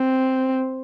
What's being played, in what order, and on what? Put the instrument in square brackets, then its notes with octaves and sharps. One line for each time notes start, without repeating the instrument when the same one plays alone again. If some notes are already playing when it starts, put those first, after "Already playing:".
Already playing: [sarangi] C4